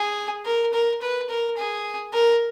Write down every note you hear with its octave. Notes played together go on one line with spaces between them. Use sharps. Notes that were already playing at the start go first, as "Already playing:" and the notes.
Already playing: G#4
A#4
A#4
B4
A#4
G#4
A#4